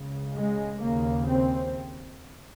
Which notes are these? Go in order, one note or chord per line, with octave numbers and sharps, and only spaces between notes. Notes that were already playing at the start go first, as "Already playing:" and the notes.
Already playing: C#2 C#3
G#3
D#2 C#3 A#3
C4